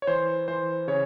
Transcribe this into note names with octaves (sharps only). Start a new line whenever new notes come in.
C#5
E3 C5
E3 C5
C#3 C#5